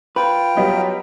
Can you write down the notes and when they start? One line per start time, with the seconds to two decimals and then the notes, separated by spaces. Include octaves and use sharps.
0.16 F4 B4 G5
0.57 F#3 G3 B3 D#5